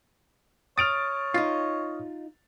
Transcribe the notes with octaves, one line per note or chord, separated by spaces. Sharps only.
C#5 D#6 F6 A6 D7 F7
D#4 F4